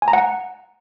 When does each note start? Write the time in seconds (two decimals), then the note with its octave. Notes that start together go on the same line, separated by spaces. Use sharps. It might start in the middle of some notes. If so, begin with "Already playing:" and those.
0.02 G#5
0.08 A#5
0.13 F#5